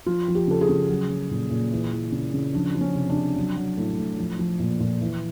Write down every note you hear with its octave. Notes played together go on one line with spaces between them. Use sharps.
F3 F4
F3
G4
C#3 A4
G#4
C#3
F#3
F#3
A#2
A#2
E3
E3
C#3
C#3
F3 D4
F3
C#4
C3
D4
C3
F#3
F#3
A2
A2
F3
F3
A#2
A#2
E3